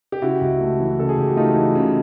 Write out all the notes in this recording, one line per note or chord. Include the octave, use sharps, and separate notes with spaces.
G4
C#3 E4 F#4
C#2
A3
E3
C#3 A4
G#4
C#2 G4
F#4
A3 D#4 F4
E3
C#3